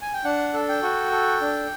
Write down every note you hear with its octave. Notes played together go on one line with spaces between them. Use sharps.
G#5
G5
D4 F#5
A4
G5
F#4
A4
D4